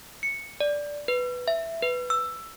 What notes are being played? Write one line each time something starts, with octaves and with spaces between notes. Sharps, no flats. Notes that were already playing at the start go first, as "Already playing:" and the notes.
C#7
D5
B4
E5
B4
E6